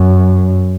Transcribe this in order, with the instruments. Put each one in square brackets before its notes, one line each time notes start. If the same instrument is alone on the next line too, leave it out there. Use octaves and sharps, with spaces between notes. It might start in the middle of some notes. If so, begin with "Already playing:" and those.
Already playing: [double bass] F#2